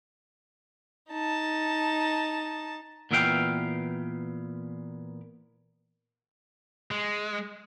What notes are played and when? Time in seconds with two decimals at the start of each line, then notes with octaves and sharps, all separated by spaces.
1.11 D#4 A5
3.11 A#2 E3 B3 E5 F5 G5
6.91 G#3